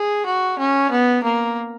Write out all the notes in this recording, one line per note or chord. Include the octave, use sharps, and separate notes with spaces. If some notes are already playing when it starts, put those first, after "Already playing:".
Already playing: G#4
F#4
C#4
B3
A#3